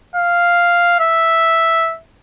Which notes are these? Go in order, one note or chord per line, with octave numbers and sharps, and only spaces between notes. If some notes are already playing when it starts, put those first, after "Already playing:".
F5
E5